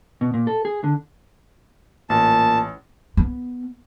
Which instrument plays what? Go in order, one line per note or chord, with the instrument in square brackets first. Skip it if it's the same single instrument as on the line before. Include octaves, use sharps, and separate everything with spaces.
[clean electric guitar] B2
A#2
A4
G#4
D3
[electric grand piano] A1 [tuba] A#2 [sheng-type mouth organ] A5
[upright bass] B3